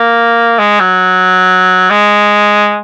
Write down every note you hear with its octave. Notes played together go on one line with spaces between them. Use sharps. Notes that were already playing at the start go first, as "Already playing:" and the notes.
Already playing: A#3
G#3
F#3
G#3